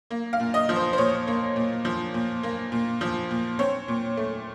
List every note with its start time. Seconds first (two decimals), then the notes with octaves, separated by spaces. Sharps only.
0.11 A#3
0.33 F5
0.40 A#2
0.54 D#5
0.69 F3
0.76 C5
0.93 C5
0.98 A#2 C#5
1.27 A#3
1.56 A#2
1.85 F3
2.14 A#2
2.43 A#3
2.72 A#2
3.01 F3
3.31 A#2
3.59 C4 C#5
3.88 A#2
4.17 A3